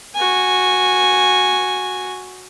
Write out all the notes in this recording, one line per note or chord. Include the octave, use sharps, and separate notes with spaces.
F#4 G#5